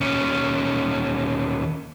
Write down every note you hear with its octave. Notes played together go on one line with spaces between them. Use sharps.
D#2 C#4